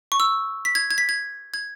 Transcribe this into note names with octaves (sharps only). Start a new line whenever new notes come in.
C#6
E6
B6
G#6
G#6
B6
G#6
G#6